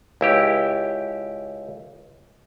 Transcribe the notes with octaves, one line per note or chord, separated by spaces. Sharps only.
C#2 E4 G4